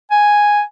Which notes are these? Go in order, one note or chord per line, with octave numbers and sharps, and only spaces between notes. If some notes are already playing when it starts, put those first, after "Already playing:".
G#5